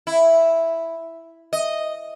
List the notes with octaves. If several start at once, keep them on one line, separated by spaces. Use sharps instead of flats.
E4
D#5